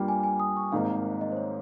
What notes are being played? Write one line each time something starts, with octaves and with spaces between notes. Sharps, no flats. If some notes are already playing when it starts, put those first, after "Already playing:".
Already playing: G2 G3 A#3 F4 G5
G#5
G#5
D#6
C#6
G#1 G#2 D#3 A#3 F5
D#5
C5
C#5